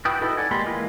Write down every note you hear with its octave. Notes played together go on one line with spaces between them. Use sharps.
E4 F#4 B4 G5 D#6
D#4 E4 F#4 A4 B4
D5 F#5 G#5
G#3 A#3 G4 B5 C6
E3 G#3 A#3 E4 F4